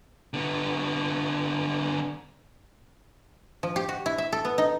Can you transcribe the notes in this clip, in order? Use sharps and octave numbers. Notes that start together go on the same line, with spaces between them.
D3 B3
F3
G4
F#4
E4
E5
A4
B3
D#4